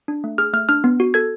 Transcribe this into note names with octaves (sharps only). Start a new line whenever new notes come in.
D4
A3
G#4 F6
A3 F6
D4 F6
B3
F#4
A4 G#6